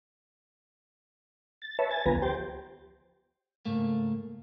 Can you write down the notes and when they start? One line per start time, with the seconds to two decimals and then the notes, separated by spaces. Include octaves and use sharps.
1.62 A6
1.79 B4 C#5 E5 A5
1.91 G#5 A6
2.06 D2 F3 B3 B4 G#5 A#5
2.22 G4 C5 G5 A6
3.66 C#2 G#2 A3 A#3